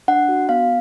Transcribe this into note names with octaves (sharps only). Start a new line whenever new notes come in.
D4 F#5
F#4
B3 F5